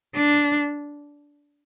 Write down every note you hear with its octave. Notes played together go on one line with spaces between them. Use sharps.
D4